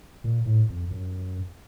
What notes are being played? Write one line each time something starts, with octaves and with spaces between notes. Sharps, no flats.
A#2
A2
F2
F#2